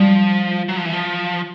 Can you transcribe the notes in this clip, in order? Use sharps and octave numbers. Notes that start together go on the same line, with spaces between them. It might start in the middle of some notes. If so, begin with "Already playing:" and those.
Already playing: F3 G3
F#3
F3
E3
F3